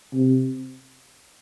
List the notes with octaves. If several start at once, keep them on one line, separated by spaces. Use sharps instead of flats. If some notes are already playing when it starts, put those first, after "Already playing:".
C3